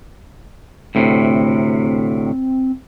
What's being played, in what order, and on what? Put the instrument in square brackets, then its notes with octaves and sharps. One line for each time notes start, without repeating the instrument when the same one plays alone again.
[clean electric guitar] D2 A2 C3 [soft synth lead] C4